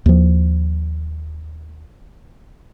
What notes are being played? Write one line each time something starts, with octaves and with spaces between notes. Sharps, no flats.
D#2 F3